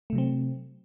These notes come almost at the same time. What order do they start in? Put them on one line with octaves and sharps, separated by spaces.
A3 C3 F#3 C4